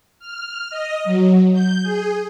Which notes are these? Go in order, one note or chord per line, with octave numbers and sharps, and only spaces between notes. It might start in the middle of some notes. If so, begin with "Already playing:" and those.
F6
D#5
F#3
G6
G#4